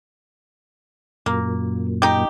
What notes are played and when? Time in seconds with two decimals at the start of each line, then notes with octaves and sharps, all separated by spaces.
1.26 F#2 A#2 A#3
2.02 D#4 G4